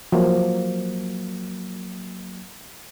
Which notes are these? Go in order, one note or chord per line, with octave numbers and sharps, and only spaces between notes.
F3 F#3 A#3